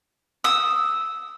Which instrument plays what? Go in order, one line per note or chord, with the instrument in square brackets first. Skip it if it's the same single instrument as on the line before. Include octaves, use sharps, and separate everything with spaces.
[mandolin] D#6 E6